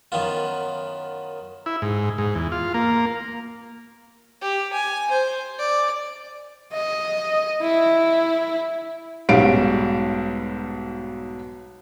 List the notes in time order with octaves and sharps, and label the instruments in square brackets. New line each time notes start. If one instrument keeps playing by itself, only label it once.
[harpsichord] F#2 D#3 B3 F4
[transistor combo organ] E4
G#2
G#2
E2
F4
A#3
[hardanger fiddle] G4
G#5
C5
D5
[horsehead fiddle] D#5
E4
[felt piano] B1 G#2 G3 C#4 F5 D7